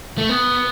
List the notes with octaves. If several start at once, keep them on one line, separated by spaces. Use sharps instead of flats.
A3
B3